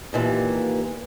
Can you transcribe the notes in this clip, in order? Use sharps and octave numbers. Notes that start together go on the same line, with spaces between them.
D#2 A#2 E3